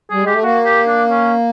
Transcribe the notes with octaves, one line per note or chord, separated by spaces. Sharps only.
G3 G#4
G#3 G4
A3
A#3 F#4
G4
D4
C#4